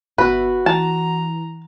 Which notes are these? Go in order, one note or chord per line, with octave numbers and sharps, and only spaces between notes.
G1 B3 F#4 B4 E5
E3 A5 A#5